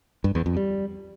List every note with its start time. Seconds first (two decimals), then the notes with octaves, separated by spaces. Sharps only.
0.24 G2
0.35 E2
0.46 F2
0.57 G3